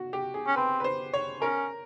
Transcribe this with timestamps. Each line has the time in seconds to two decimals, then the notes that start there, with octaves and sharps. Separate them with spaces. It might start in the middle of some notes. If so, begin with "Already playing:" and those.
Already playing: F#4
0.13 G4
0.34 G#4
0.47 C#4
0.56 C4 B4
0.80 B4
0.84 C5
1.13 C#5
1.42 C#4 A#4